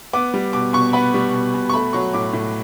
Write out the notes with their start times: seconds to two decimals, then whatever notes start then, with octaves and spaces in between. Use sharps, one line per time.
0.13 B3 D6
0.34 G3
0.53 B2 D6
0.73 B2 C#6
0.93 B3 B5
1.14 G3
1.33 B2
1.54 B2
1.70 C#6
1.73 A3 B5
1.93 F#3 C#6
2.13 A2 D6
2.33 A2